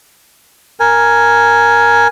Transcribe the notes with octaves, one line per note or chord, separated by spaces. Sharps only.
A#4 G#5